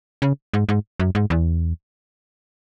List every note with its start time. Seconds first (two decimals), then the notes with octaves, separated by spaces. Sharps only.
0.22 C#3
0.54 G#2
0.69 G#2
1.00 F#2
1.15 G#2
1.30 E2